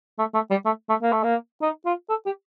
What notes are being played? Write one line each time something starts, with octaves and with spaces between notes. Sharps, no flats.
A3
A3
G3
A3
A3
A#3
A3
A#3
D#4
F4
A4
G4